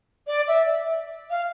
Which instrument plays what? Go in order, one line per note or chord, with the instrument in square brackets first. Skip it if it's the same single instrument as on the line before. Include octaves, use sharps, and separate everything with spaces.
[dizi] D5
E5
F5